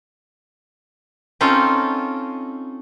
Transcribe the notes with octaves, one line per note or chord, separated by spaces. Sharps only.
C4 C#4 D#4 F4 A4